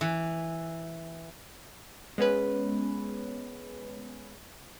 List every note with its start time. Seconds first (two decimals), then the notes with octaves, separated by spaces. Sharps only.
0.01 E3
2.18 G#3 B3 C#4 B4